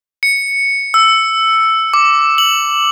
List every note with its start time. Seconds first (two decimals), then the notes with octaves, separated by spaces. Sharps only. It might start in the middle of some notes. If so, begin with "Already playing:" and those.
0.23 C#7
0.94 E6
1.94 D6
2.38 F#7